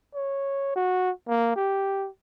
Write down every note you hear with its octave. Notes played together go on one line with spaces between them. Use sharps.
C#5
F#4
A#3
G4